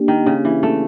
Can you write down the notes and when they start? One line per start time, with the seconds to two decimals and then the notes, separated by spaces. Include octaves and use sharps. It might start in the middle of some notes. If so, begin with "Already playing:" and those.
Already playing: A#3 D4 G4
0.08 D#3
0.26 C#3
0.45 E3
0.63 A3